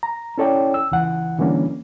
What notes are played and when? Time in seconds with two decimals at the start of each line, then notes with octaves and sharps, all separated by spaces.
0.03 A#5
0.38 C#4 E4 A4 C#5 D5 G5
0.74 E6
0.92 C#2 E3 F#5
1.38 D3 E3 G3 A#3 C#4 D4